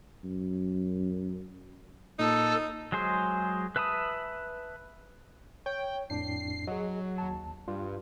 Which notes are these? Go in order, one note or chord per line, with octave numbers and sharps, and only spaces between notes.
F#2
A#2 D#4 A4
F#3 G#3 G#4 C5
B4 E5 A5 B5 D#6
C#5 G5
F2 A2 D4 C7
F#3 G#4 D#5
D#2 A5
G2 F4